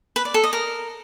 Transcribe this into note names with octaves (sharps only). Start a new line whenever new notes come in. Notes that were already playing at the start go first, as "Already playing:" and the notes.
B4
D5
A4
D#5
A#4